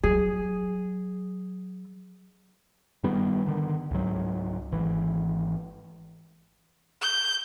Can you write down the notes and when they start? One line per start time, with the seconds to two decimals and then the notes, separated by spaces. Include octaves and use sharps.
0.04 F#3 G#4
3.03 G2 D#3 G3 B3
3.46 D3 D#3
3.91 C#2 G#2 F#3
4.72 G#1 E3
7.02 G6